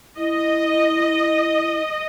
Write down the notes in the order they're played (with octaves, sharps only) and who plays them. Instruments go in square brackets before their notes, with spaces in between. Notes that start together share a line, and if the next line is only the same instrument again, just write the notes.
[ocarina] E4 [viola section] D#5